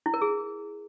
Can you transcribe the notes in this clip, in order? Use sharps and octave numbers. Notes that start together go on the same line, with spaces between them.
E4
A#4
G#4